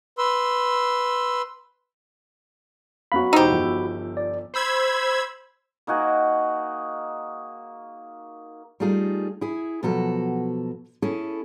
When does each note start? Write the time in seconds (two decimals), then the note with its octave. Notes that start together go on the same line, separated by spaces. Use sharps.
0.18 B4 C6 E6
3.12 F#2 B3 F#4 F5 B5
3.33 E1 D#4 G4 C5 E6
3.51 G1 F3
4.17 D5
4.54 C5 B5 E6 G#6
5.87 A#3 D#4 F#4 G#4
8.80 G3 A3 D#4 F4 G#4
9.41 E4 G#4
9.83 B2 F3 F#3 F#4 A4
11.02 C#4 E4 G#4 A4